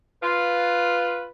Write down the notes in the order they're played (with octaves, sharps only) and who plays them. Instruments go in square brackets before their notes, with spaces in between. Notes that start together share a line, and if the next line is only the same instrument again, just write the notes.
[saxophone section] F4 B4